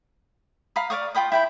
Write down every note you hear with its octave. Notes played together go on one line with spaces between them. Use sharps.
F5 A#5 B5 D#6
D5 F5 C#6 D#6
F4 G5 B5 D#6
E4 G5 B5